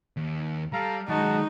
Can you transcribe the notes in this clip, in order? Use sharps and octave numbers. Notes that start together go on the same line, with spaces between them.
D#2
G3 A4 F5 A#5
D#3 F#3 G#3 D#4 F#4 A5